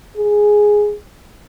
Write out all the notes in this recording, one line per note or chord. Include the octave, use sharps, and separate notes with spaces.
G#4